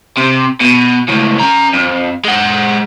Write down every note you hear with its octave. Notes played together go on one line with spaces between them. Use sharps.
C3
B2
C#2 A2
C#4 A#5
F2
G#3 F#5